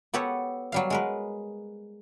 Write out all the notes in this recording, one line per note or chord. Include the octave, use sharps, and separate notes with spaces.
B3 G4 A4 B4 C#5 F#5
F#3 G3 F5
G#3 A#4 B4